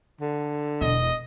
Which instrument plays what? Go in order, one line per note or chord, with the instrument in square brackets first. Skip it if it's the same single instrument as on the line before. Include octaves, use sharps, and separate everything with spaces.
[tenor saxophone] D3
[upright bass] E1 [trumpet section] D#5